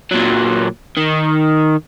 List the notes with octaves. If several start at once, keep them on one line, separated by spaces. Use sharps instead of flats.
A#2 F#3
D#3